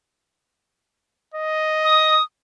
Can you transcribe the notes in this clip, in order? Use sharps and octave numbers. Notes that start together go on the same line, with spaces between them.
D#5
D#6